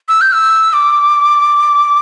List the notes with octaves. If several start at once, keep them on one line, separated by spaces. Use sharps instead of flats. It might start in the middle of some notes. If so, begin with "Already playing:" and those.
E6
G6
E6
D6